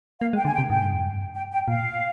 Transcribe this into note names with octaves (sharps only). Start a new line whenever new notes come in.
A#3 F5
G#3
G5
D3 G#5
G5
C3
G#2 G5
G2
F2
G2
G5
G5
A#2 F5